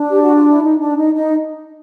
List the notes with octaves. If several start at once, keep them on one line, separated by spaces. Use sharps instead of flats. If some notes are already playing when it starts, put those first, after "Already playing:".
Already playing: D4
G4
F#4
F4
E4
D#4
D4
D#4
D#4